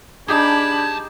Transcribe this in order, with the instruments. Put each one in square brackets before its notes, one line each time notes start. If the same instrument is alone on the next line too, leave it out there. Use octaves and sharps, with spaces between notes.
[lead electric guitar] F#2 A5 [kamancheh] D4 B5 [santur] D#4 G4 G#4 [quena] G#6